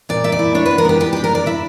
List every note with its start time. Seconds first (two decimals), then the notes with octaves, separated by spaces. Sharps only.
0.09 A#2 D5
0.24 A#2 E5
0.32 D5
0.39 E4
0.55 D4 C#5
0.66 B4
0.71 B3
0.78 A#4
0.85 B3 G4
1.00 D4 G4
1.13 D4 G4
1.24 A#4
1.31 D4 D5
1.46 E4 E5